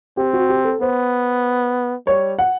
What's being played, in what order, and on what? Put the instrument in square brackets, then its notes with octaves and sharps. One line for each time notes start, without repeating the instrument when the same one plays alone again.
[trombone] C4 [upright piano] G4
[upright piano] F#4
G4
A4
[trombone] B3 [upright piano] C5
[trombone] G3 [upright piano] C#5
[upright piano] F#5